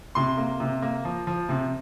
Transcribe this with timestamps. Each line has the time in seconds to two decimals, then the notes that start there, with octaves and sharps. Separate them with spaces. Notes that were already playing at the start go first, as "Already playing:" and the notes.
0.15 C3 C6
0.37 A#3
0.60 C3
0.82 A#3
1.05 F3
1.27 F3
1.49 C3